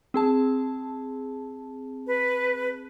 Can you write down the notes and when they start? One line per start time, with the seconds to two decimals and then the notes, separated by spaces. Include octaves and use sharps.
0.14 C4 G#4 A5
2.07 B4